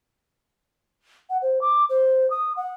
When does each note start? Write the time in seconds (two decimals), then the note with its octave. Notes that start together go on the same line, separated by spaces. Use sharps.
1.30 F#5
1.42 C5
1.61 D6
1.89 C5
2.30 D#6
2.57 F#5